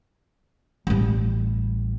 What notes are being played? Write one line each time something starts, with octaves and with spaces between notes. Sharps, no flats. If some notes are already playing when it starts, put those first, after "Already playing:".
A1 G3